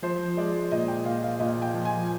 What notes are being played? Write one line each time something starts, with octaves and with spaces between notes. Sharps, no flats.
F3 C5
G#3 D5
A#2 D#5
G5
A#2 F5
F5
A#2 D#5
G5
F3
G#5